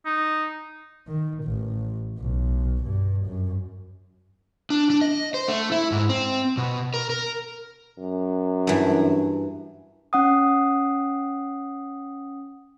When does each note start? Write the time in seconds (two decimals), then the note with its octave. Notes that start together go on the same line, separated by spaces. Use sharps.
0.06 D#4
1.08 D#3
1.45 A1
2.18 B1
2.84 G2
3.26 F#2
4.70 D4
4.90 D4
5.01 D#5
5.34 C5
5.48 A3
5.72 E4
5.92 G#2
6.09 C4
6.57 B2
6.94 A#4
7.10 A#4
7.98 F#2
8.67 G2 E3
10.13 C#4 F#5 D#6